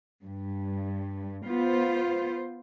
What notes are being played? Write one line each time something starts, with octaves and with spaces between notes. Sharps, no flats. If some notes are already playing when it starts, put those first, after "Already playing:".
G2
B3 F4 C5